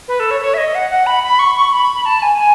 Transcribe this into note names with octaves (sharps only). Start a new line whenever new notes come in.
B4
A4
C#5
C#5
E5
D#5
F#5
F#5
B5
B5
C#6
C#6
B5
A5
G#5
G#5